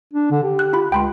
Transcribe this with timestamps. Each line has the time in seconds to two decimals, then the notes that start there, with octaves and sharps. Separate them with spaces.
0.13 D4
0.31 D3
0.43 G4
0.59 F#6
0.73 F4 B5
0.92 C#2 G5 B5 C6